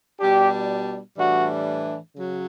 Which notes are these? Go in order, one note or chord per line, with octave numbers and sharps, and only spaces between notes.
B2 G3 D4 G4
A2 E3 G3 D4 F#4
C#3 F#3